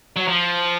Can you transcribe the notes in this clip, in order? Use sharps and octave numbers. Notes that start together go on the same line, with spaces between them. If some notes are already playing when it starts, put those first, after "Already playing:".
F#3
F3